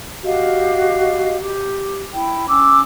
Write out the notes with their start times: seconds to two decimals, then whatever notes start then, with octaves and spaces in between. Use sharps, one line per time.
0.24 F#4 G4 D#5 F5
1.40 G4
2.13 E4 G5
2.48 C#4 D6 E6